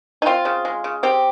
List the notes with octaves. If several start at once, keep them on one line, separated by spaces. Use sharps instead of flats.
D#4
C4 F4
C#3
G#3
C#3
C4 G4